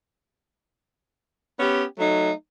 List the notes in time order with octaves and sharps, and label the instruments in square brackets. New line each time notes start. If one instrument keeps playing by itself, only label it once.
[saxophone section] B3 C#4 G4
F#3 A3 D#4